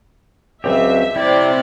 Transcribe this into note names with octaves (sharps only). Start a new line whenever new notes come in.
C#2 F#3 C4 G4 E5
C3 G3 E4 D5